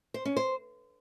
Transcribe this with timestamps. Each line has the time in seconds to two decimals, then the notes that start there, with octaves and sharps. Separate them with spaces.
0.14 C5
0.25 C#4
0.37 C5